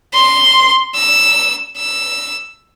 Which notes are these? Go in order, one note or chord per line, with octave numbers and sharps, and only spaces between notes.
C6
E6
E6